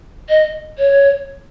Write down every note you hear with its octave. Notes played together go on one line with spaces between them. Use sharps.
D#5
C#5